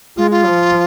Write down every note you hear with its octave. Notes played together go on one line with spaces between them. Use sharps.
G#3 F4
F4
F3